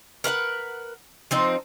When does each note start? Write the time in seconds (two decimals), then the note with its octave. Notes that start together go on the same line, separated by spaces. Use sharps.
0.24 A#4 B4 F5 F#5
1.31 F3 C4 D#4